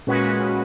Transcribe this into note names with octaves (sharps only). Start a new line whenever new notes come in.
A#2 G#3 C#4 F#4 B4